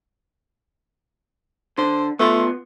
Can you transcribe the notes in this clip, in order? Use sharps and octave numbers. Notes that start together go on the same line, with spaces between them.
D3 C5
A3 B3 F4 C6